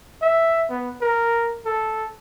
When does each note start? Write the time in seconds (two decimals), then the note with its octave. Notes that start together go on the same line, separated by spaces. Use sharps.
0.22 E5
0.70 B3
1.01 A#4
1.65 A4